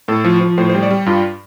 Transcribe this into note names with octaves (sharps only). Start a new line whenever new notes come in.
A2 A4
F3
F3
A2 C5
C5
G3
D5
G3
G2 F4